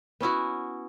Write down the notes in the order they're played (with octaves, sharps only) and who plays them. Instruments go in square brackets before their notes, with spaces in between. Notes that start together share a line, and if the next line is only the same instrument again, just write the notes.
[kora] B3 C#4 E4 F#4